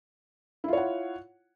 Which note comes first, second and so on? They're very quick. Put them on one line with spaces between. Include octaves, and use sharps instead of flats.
E4 F4 C#5 F#5